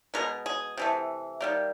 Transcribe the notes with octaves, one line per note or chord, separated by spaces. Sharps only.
B2 G#3 B3 A#4
G#4
C3 E3 A3
D#3 G3 A#3